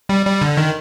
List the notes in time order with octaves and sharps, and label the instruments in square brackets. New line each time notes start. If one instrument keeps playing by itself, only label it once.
[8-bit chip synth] G3
G3
D3
D#3